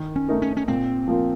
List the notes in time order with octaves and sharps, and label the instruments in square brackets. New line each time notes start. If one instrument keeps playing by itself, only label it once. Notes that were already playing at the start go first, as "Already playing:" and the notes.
Already playing: [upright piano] D#3
[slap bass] C#4
[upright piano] A3 D#4 A#4
[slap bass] C#4
C#4
[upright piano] A#2 [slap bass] C4
[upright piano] F3 A#3 F4